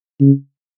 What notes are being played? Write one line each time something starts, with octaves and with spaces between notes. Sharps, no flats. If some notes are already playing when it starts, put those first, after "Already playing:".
C#3